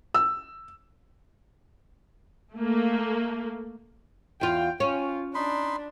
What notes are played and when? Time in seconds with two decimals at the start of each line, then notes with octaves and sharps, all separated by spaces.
0.14 E6
2.54 A3 A#3
4.41 E2 F4 G5
4.80 C#4 F4
5.35 D4 D#4 B5 C6